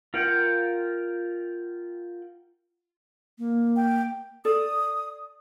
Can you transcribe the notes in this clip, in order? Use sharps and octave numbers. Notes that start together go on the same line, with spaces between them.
F4 A#4 F#5 G5
A#3
G5
A4 D5 D#6